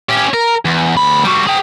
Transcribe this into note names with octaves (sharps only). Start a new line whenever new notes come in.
C#4 G4
A#4
E2
D2 B5
G3 F#4
G#4 G5